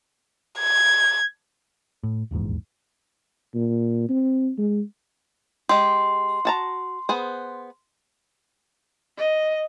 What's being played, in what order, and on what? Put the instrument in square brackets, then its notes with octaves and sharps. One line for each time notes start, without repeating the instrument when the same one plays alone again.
[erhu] G#6
[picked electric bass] A2
D#1 A#1 E2 G#2
[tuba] A#2
C4
G#3
[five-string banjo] G#3 G4 [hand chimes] C6
[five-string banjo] F#4 A5 A#5
B3 G#4 C5
[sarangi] D#5